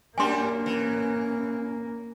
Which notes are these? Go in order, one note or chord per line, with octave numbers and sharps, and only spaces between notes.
F#2 G3 A#3 D4 G4 G#5 C6
E3 C#4